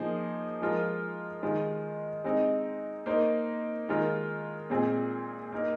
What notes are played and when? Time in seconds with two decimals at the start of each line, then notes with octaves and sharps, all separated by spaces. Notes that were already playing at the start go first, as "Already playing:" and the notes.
Already playing: F3 A#3 D#4 G#4 C5
0.61 F3 G#3 F4 A#4
1.42 D#3 G#3 F4
2.24 G#3 C4 D#4
3.06 A#3 D#4 C5
3.88 D#3 G#3 F4 A#4
4.70 A#2 G#3 C4 F4 G#4
5.52 A#3 D#4 A#4